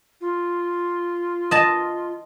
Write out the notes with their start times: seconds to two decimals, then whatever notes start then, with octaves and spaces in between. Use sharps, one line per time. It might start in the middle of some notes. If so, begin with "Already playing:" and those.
0.21 F4
1.51 D#5 A5